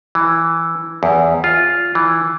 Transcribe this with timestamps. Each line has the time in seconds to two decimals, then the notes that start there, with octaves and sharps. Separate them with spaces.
0.15 E3
1.03 E2
1.44 F4
1.95 E3